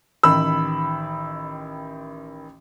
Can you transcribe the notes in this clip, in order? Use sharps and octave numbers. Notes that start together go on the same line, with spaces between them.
A1 D#3 B5 E6